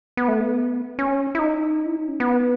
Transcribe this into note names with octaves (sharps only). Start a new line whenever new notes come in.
B3
A3
B3
C#4
E4
D#4
E4
D#4
C#4
B3